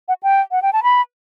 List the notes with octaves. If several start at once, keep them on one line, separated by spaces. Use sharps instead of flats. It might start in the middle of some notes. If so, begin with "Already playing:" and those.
F#5
G5
F#5
G5
A5
B5